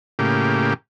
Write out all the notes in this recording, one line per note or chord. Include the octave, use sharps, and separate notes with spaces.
A2 C#3 A#3 G4